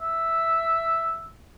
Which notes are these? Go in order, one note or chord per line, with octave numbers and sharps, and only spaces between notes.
E5